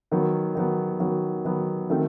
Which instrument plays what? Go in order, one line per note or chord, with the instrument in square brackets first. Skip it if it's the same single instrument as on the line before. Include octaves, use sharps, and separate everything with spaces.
[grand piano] D#3 F#3 B3
D#3 F#3 B3
D#3 F#3 B3
D#3 F#3 B3
D#3 F#3 A3 C4